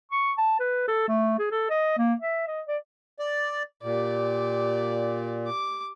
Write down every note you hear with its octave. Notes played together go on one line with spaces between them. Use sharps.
C#6
A5
B4
A4
A3
G#4
A4
D#5
A#3
E5
D#5
D5
D5
A#2 G4 D5
D6